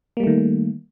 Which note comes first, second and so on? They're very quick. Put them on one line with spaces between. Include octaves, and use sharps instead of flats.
A#3 G3 A3 D#3